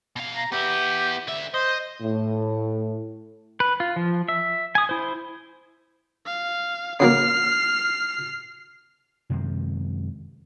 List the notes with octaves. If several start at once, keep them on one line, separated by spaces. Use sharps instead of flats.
B2 F5
A#5
B3 E4 G4
D3 E5
C5 D#5
A2
B4
F4
F3
E5
G#5 D#6
E4 C5
F5
C#3 F#3 A#3 F6 C7
F#2 C3 D#3 G#3